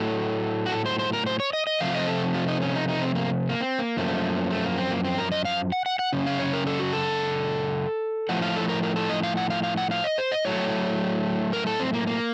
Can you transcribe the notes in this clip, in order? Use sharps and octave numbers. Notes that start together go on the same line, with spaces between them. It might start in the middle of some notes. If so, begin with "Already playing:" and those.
Already playing: A2 F#3 A3 A4
F#4
A4
C5
C5
A#4
C5
C#5
D#5
D#5
C3 F3 A3 F5
D#5
A4
F4
D#4
C#4
D#4
D#4
C4
A#3
A#3
C4
A#3
F#2 F3 A3
A3
A#3
C4
A#3
C4
A#4
D#5
F5
F#5
F#5
F#5
F#2 C#3
F5
C#5
A#4
A4
F#4
A4
A2 F3 A3 F#5
F5
A4
A#4
A#4
A4
D#5
F5
F#5
F5
F5
F#5
F5
D#5
C5
D#5
A2 F#3 A3 C#5
A#4
A4
C4
A#3
A#3